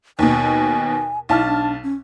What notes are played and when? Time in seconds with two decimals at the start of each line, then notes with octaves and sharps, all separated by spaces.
0.19 D#2 B2 G#5
1.29 B1 E4 A5 F6
1.46 D4
1.83 C#4